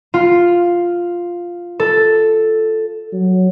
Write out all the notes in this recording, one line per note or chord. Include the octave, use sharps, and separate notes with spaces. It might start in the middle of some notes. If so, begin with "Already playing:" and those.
F4
A4
F#3